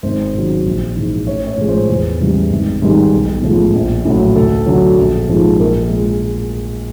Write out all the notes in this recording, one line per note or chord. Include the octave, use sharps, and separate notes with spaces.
G#1 C5
G#2 D#3 F#3
A#1
G#2 E3
A1 C#5
C#5
A2 F3 G#3
C5
E2
C#3 E3 G3
G#1
G#2 D#3 G3
B1
A2 F3 G#3
A#1
A2 F#3
D2 A4
D3 F#3
A#1
G#2 F3 G#3
A#1 A#4
F3 G#3